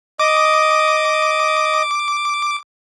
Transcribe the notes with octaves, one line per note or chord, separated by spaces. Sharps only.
D#5 D6 D#6